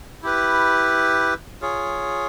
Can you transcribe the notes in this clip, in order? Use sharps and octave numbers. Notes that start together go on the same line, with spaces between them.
E4 G4 B4
F4 G#4 C#5